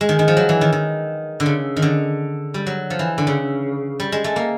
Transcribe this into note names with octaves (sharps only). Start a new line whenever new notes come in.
G#3
D#3
D#3
F3
F#3
E3
D#3
D#3
D3
C#3
D#3
D3
G3
F#3
F3
E3
D3
C#3
G3
G#3
A3
A#3